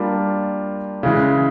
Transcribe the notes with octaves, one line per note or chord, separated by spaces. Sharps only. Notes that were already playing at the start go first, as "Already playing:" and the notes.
Already playing: G3 A#3 D4 F4
C#3 E3 G#3